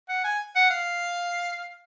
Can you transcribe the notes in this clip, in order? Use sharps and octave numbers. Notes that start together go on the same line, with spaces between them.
F#5
G#5
F#5
F5